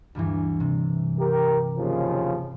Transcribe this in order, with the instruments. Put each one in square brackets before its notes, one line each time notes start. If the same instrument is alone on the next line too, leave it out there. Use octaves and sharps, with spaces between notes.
[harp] D2 G2 E3
C3
[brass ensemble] G4 A#4
D#2 C#3 F3